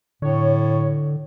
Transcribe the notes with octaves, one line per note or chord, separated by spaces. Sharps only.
A2 D3 C#5